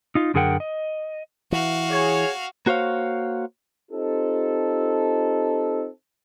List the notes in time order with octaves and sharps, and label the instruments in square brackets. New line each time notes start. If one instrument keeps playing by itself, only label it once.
[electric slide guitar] D#4 F4
F#2 D3 G#4 A#4 F#5 G5
D#5
[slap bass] E3 [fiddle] F#4 F5
[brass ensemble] G#4 C#5
[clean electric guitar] A#3 F#4 C5 C#5 F5
[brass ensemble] C4 D#4 F4 G4 A4